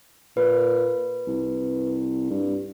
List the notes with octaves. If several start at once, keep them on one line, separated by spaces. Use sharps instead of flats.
A#2 B4
C2
G2